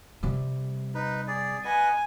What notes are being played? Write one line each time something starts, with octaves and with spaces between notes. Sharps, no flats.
C3 G3
D#4 B4
G#4 D5
B4 D#5 F#5 G#5